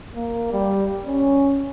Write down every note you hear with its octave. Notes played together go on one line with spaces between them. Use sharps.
A#3
G3
C#4